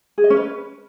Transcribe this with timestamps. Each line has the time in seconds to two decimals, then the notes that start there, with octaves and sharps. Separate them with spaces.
0.18 G#4
0.24 D#5
0.30 C#4
0.37 B4